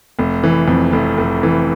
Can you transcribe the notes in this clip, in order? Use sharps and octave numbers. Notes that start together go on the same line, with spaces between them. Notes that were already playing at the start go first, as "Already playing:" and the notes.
F1
E3
F2
F1
F1
E3